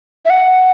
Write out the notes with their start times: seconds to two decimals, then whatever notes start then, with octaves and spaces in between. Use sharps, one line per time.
0.25 E5
0.30 F#5